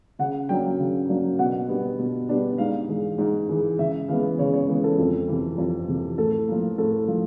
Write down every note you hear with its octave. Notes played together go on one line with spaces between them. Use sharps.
C#3 F#5
F#3 A#3 D4 G5
C#3
F#3 A#3 D4
B2 F#5
G3 B3 D4
B2
G3 B3 D4
G#2 F5
E3 G#3
G#2
E3 G#3
C#3 E5
E3 G#3 B3 F5
C#3 C#5
C#5
E3 G#3 B3
A4
F2
C3 E3
F2
C3 E3
A2 A4
F3 A#3
A2 A4
F3